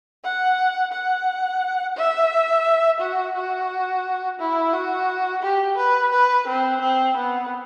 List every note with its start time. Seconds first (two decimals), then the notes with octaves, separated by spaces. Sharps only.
0.24 F#5
0.92 F#5
1.97 E5
3.00 F#4
3.35 F#4
4.39 E4
4.73 F#4
5.42 G4
5.77 B4
6.12 B4
6.47 C4
6.81 C4
7.16 B3